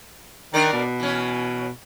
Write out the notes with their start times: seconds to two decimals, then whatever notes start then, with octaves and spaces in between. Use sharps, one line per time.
0.54 D#3 D4 A#4 D5
0.73 B2
1.00 E3 C#4